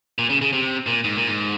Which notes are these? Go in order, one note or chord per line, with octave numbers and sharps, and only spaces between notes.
A#2
C#3
C#3
C3
A#2
G#2
A#2
G#2